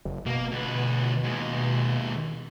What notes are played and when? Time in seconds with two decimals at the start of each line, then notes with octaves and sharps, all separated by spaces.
0.05 F#1
0.26 B2 A#3
0.52 D2 B4
1.23 D#2 G#3